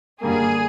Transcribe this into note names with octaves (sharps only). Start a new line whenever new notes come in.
F#2 D3 G3 A#3 G#4